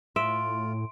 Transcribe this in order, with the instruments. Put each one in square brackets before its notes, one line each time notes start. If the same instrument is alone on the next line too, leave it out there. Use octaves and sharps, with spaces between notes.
[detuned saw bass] A2 [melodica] F4 [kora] E5 [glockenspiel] C6 D7